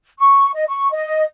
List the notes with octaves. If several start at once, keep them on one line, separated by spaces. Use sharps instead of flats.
C#6
D#5
C#6
D#5